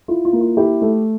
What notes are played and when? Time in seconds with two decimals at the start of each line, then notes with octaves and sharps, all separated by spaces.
0.08 E4 F4
0.25 F4
0.33 A#3
0.41 F4
0.57 E4 G4
0.82 A3